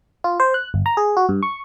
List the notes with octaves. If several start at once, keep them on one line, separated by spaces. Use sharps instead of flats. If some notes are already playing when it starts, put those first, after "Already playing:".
F4
C5
F#6
G1
A#5
G#4
F#4
G2
C#6